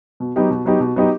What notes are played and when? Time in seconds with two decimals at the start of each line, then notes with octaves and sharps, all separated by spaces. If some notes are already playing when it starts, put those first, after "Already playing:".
0.20 B2
0.36 F#3 B3 D#4 G4
0.50 B2
0.65 F#3 B3 D#4 G4
0.80 B2
0.96 F#3 B3 D#4 G4